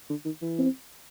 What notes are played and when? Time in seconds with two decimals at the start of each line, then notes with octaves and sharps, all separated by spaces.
0.10 D3
0.25 D#3
0.42 E3
0.59 C4